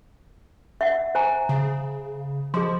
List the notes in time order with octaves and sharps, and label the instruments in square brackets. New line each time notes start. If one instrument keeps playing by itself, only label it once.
[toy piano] E5 F#5
C5 G#5 A#5
[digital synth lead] C#3
[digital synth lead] F3 [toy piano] G#4 D#5 C6